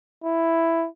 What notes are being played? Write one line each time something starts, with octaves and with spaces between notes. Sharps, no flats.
E4